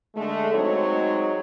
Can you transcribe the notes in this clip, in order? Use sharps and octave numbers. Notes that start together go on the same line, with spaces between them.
D3 G#3 A3
F#3 G#3 C4 D#4 C#5